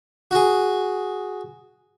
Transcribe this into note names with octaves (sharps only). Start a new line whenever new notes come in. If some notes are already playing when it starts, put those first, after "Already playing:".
F#4 G#4